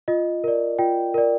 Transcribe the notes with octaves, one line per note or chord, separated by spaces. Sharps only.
F4 D#5
A#4 D5
F4 G5
A#4 D5